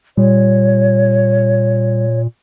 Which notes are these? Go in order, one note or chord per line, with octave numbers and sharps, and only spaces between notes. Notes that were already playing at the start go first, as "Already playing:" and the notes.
A#2 G3 C#5